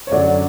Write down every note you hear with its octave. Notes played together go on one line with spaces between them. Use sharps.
C#5
F#2 D3 F#3 D5